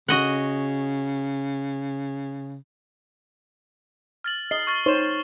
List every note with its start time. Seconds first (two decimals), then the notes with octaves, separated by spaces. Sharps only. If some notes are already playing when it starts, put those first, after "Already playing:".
0.08 C#3 F#4 D#5 F#5
4.24 F6 A6 F#7
4.51 D#5 C7 G7
4.67 C#6 F6 A6
4.86 D#4 C5 C#5 C#6 E7